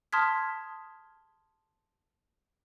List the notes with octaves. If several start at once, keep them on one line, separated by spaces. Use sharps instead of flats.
A5 C6 D#6 F6 G#6 B6